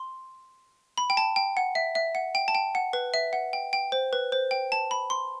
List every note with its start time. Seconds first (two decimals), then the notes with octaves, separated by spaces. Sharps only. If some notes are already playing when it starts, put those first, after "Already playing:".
Already playing: C6
0.98 B5
1.10 G5
1.17 A5
1.36 G5
1.57 F#5
1.75 E5
1.95 E5
2.15 F#5
2.35 G5
2.48 A5
2.55 G5
2.75 F#5
2.93 B4
3.14 E5
3.33 F#5
3.53 G5
3.73 G5
3.92 C5
4.13 B4
4.32 C5
4.51 G5
4.72 A5
4.91 B5
5.10 C6